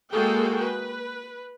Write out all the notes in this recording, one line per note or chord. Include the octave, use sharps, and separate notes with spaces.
G#3 A#3 F#4 G#4 A4 G5
B4